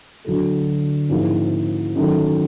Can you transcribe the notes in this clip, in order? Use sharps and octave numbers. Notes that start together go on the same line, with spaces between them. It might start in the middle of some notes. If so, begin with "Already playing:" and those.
D2 D3 F#3 A3
G#2 F3 A#3 C#4 E4
F#2 D#3 F#3 A3